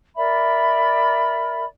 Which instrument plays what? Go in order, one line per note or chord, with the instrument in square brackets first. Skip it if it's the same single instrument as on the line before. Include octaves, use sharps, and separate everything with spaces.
[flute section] A#4 D5 E5 B5